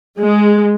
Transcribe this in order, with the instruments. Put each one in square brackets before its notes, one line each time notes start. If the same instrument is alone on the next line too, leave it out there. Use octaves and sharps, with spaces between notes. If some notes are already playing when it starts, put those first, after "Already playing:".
[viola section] G#3